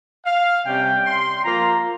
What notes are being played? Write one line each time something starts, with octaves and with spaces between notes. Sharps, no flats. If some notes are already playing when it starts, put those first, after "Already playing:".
F5
C3 G3 C#4 G5
C6
F3 A#3 F4 A#5